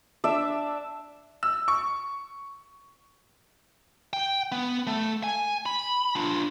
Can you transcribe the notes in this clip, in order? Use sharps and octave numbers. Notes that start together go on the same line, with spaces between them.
D4 D5 E5 E6
E6
C#6
G5
B3
A3
G#5
B5
D4 F4